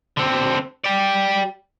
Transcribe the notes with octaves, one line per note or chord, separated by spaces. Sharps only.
D3 C4
G4 D5